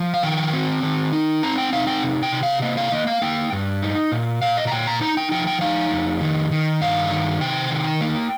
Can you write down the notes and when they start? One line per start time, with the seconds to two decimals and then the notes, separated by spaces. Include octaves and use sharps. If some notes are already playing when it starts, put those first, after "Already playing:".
Already playing: F3
0.14 F5
0.23 D#3 G5
0.53 C4
0.83 D#3
1.12 D#4
1.43 C4 A#5
1.58 G5
1.73 D#4 F5
1.87 G5
2.03 C3
2.23 G5
2.32 C3
2.43 F5
2.62 A#3 D#5
2.77 F5
2.92 A#3 D#5
3.07 F5
3.22 A#3 G5
3.53 G2
3.82 D#4
4.12 A#2
4.42 A#2 F5
4.57 D#5
4.67 A#5
4.72 A#2 G5
4.87 A#5
5.01 D#4 A#5
5.17 G5
5.32 F3 G5
5.47 G5
5.61 D#4 F5
5.91 F2
6.21 D#3
6.51 D#3
6.81 G2 F5
7.10 D#3
7.41 C3 G5
7.70 D#3
8.01 A#3